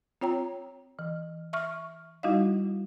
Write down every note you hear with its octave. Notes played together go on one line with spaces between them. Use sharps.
C4 F4 C#5 G5 A#5
E3
E5 C#6 F6
G3 D#4 E4 F#4 D#5 F5